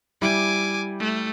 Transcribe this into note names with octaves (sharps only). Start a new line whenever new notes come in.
G3 E4 G#5 D6
A3